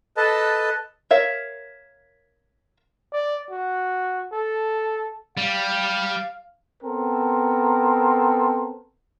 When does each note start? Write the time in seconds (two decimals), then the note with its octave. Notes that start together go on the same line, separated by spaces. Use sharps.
0.17 A4 B4 D#5 A5
1.11 A#4 C#5 E5 F5
3.13 D5
3.50 F#4
4.32 A4
5.37 G3 F5
6.83 B3 C4 A4 A#4